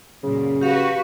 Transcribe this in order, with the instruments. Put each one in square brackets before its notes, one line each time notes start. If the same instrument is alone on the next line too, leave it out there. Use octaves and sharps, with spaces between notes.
[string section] F#2 A#2 [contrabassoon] C#3
[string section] F#4 B4 [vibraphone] G4 F5